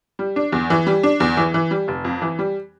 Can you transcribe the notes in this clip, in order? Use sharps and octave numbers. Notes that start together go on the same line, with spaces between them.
G3
D4
E2
E3
G3
D4
E2
E3
E3
G3
F1
F2
E3
G3